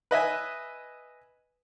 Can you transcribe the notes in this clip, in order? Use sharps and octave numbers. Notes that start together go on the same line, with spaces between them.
B4 D#5 E5 G#5